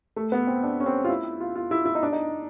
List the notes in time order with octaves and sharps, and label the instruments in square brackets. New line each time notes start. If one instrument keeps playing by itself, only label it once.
[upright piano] A3
B3
C4
D4
C#4
C4
F4
E4
F4
F4
E4
E4
D#4
D4
D#4